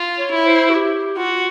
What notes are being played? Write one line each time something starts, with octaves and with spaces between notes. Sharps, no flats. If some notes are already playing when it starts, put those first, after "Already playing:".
Already playing: F4
C#5
E4
C5
F#4
G4
F4 F#4